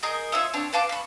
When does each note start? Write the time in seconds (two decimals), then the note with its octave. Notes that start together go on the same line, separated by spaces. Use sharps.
0.03 G#4 A#4 D#5 G6
0.32 F4 C#5 E5 D#6
0.53 C4 D4 C#5
0.73 B4 F5 A5 D6
0.89 B5 C#6